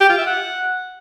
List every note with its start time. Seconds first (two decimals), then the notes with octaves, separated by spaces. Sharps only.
0.01 G4
0.09 F4
0.18 E5
0.27 F#5